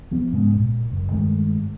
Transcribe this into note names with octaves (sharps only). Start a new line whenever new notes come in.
F3 B3
G#2 C#3 G#3 B3
A#2
F#1
G2 D#3 G#3 A3